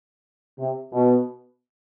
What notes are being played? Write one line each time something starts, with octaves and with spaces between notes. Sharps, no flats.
C3
B2